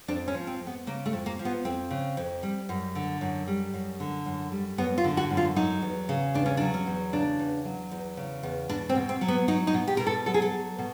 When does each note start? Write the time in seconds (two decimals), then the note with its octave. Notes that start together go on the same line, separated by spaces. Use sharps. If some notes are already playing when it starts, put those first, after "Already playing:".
0.08 F2 D4
0.28 C#4
0.34 F3
0.47 C4
0.60 F2
0.67 B3
0.87 C#3 A#3
1.06 A3
1.13 F2
1.26 A#3
1.39 F3
1.45 B3
1.65 F2 C4
1.91 C#3
2.17 F2
2.43 G3
2.69 F#2
2.95 D3
3.21 F#2
3.47 G3
3.74 F#2
4.00 D3
4.26 F#2
4.52 G3
4.78 F#2 B3
4.98 F4
5.04 D3
5.17 F#4
5.30 F#2
5.37 F4
5.56 F#3 D#4
5.82 E2
6.09 C#3
6.34 E2 D4
6.46 C#4
6.57 D4
6.61 F#3
6.74 C#4
6.87 E2
7.13 C#3 D4
7.39 E2
7.65 F#3
7.91 E2
8.17 C#3
8.43 E2
8.69 B2 D4
8.89 C4
8.95 B2
9.09 C4
9.21 F#3
9.28 B3
9.48 F#3 D#4
9.67 D#4
9.74 B2
9.88 G4
9.97 B2 A#4
10.07 A4
10.26 F#3 A4
10.34 G#4
10.42 A4
10.52 F#3
10.78 B2